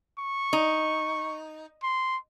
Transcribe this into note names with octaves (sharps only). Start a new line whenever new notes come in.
C#6
D#4
C6